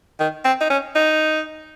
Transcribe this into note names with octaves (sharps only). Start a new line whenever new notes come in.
D#3
C4
D#4
C#4
D#4